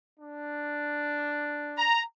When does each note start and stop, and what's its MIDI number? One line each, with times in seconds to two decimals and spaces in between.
0.20 1.89 62
1.78 2.02 82